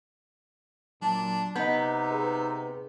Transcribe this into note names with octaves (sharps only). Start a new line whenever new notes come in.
A#2 F#3 D4 A5
C3 B3 D#4 D#5 G6
G#4 B4